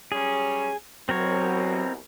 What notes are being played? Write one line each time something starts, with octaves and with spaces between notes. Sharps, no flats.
F#3 G3 C#4 G#4
C2 B2 F#3 C4 A#4 C#5